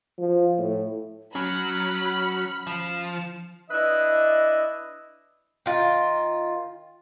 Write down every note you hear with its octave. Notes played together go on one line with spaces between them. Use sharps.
F3
A2
F#3 C#4 B5 F6
F3 E7
D4 E4 B4 D#5
D#3 F4